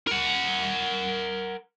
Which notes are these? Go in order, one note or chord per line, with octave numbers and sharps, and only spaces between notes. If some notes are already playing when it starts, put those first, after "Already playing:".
A#4 F#5